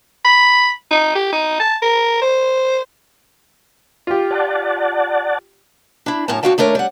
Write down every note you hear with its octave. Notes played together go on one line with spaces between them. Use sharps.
B5
D#4
G4
D#4
A5
A#4
C5
F4 G4
D5 F#5 A5
D4 E4
F#2 A2 C#3 A#4 A5
D2 F#3 F#4 F5 G5 A5
D#2 A3 D4 A#4 C#5
G3 F#5